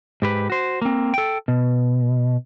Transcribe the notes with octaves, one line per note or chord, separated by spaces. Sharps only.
G#2 G4 B4
F#4 C5
A#3 C4
A4 G5
B2